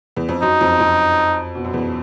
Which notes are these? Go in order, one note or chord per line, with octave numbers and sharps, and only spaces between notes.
E2
F2
F#2 D#4
F2
F2
B2
F#2
E2